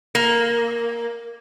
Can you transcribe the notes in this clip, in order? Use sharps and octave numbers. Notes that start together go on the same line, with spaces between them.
A#3